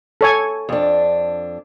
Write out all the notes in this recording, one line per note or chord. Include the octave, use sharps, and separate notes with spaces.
A4 C#5 G#5
F2 D4